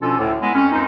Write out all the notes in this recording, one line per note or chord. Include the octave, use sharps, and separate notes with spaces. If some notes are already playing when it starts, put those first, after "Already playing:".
B2 F3 C#4 D4 F4 A4
D2 A2 D3
G#3 B3 E4
F2 C#4
C#2 F#2 C4 D#4